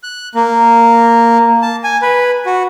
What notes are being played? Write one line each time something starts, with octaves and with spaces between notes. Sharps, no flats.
F#6
A#3
A5
G#5
B4
F#4